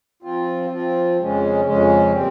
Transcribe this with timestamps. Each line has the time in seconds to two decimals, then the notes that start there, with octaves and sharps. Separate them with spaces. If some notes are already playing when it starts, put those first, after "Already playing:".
0.22 F3 C4 F4
0.70 F3 C4 F4
1.18 F2 C#3 G#3 C#4
1.65 F2 C#3 G#3 C#4
2.12 A#2 G3 C4